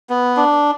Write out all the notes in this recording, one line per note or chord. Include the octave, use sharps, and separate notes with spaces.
B3
D4